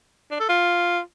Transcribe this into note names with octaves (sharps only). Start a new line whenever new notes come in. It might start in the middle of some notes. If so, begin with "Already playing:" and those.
D4
A4
F4